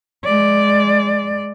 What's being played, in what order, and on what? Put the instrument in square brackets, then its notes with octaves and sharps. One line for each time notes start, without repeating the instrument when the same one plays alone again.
[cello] G#3 D5